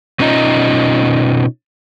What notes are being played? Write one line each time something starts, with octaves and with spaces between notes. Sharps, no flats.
B2 C#4 D#4 F4 D#5 A#5